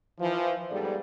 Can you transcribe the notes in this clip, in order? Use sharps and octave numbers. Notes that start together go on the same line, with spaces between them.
E3 F3
G#2 G3 B3 A4 D5